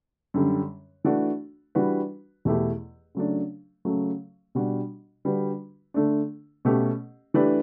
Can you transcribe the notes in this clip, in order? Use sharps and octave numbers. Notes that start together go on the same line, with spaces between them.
F#2 D3 G3
E3 A3 D4 F#4
E3 G3 D4 F#4 B4
E2 B2 A3 E4 G4
C#3 F#3 A3 D4
C#3 F#3 A3
B2 G3 D4 F#4
D3 G3 D4 F#4 B4
D3 A3 D4
B2 A3 C#4 G4
E3 A3 D4 G4 B4